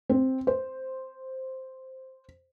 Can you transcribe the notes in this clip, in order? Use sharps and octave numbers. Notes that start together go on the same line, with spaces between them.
C4
C5